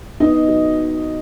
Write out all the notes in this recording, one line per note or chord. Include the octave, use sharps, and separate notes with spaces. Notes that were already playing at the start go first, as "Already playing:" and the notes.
B3 D#4 D#5
F#3